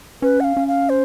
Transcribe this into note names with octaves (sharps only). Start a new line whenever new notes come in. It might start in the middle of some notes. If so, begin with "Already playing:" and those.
C#4 B4
F#5
F5
C#4
F5
C5